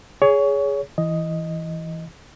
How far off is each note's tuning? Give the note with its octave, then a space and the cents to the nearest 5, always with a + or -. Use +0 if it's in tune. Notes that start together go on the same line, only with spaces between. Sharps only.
G#4 +0 C#5 +25
E3 +0 D#5 +0